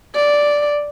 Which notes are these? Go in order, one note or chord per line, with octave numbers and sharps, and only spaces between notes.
D5